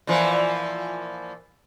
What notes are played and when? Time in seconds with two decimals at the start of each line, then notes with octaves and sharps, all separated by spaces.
0.07 A#2 E3 F3